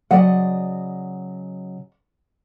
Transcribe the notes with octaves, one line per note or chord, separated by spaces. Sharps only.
C#3 F#3 D5 D#5 F#5